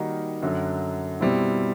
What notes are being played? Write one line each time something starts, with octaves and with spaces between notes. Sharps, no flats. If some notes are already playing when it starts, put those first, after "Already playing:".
Already playing: D#3 G3 A#3 D#4 F#4
F#2 D3 F#3
B2 G3 C4 E4